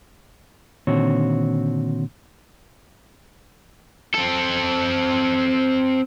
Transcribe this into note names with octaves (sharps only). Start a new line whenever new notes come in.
A#2 D3 D#3 C4 F#4 C#5
C4 A4